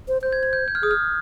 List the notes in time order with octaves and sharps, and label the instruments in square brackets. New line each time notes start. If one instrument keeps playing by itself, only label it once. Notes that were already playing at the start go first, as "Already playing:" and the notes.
[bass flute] C5
[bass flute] C5 [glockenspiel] G6
[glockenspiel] G#6
G#6
G6
G6
F6
[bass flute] G#4 [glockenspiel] D#6
[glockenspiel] F6